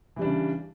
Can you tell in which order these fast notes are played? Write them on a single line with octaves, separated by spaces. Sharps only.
E3 G3 D4 C#3